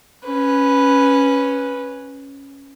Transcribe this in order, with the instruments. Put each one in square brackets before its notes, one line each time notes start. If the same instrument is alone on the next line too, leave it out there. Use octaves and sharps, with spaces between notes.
[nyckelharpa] C#4 B4